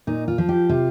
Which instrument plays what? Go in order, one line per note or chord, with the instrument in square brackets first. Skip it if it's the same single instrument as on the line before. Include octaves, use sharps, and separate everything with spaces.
[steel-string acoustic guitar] A#2 D#4
F4
F3
G4
C3 F4